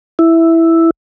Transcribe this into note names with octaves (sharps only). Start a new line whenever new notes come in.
E4